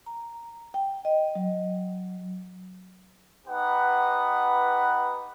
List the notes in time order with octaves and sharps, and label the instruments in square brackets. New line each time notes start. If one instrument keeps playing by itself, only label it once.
[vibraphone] A#5
G5
D#5
F#3
[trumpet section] B3 D#4 G4 B4 F#5